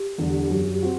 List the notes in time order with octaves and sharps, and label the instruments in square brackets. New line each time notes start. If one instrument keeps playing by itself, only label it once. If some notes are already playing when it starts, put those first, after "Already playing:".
Already playing: [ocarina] G4
[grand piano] E2 D3 G3
F#2
C4 F#4